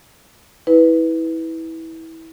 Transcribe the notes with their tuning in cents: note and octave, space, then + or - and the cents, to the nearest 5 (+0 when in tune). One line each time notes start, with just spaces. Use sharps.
E4 -25 B4 +0